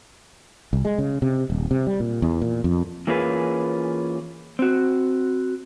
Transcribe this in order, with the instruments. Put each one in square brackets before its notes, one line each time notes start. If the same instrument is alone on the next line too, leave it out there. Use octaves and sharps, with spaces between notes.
[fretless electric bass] C2
G#3
C#3
C3
D#1
C3
G3
A#2
E2
A#2
F2
[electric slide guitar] E3 A#3 C#4 F4 G#4 B4
C4 F#4